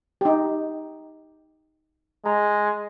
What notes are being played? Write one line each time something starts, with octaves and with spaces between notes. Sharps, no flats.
D#4 G4
G#3 A#5